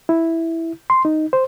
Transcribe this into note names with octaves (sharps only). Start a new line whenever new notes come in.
E4
C6
D#4
C5